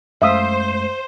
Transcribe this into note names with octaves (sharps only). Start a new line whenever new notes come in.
F#2 G#3 A3 C5 E5 F5 D#6